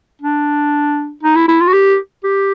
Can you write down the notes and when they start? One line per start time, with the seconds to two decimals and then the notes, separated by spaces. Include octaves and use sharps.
0.21 D4
1.23 D#4
1.35 E4
1.48 E4
1.61 F4
1.68 F#4
1.73 G4
2.24 G4